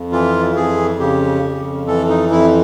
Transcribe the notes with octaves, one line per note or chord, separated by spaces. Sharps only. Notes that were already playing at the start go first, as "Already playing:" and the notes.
Already playing: F2
E3 F4
F2 G#4
C#3 G4
F2
E3 A4
D#4
F2 E4